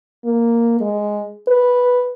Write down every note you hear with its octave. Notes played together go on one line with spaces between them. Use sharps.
A#3
G#3
B4